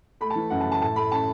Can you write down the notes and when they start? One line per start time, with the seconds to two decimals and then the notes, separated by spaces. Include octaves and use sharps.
0.21 A3 B5
0.30 A5
0.36 E3
0.50 F#2 F#5
0.60 A5
0.66 C#3
0.72 A5
0.82 A2 A5
0.96 A3 B5
1.12 C#4 A5